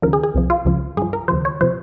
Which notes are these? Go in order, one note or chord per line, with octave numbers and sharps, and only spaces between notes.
D#2 C#3 F3 A#4
G#4
G#4
C2 C3 F3
F4
C#2 C#3 F3
G2 F3 G#4
A#4
D#2 C#3 F3 C5
C#5
C3 F3 C5